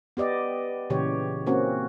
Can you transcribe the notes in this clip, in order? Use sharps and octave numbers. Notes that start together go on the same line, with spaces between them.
B3 G4 D5 D#5
A#2 C#3 E3 G4 C#5
A#3 C4 C#4 F#4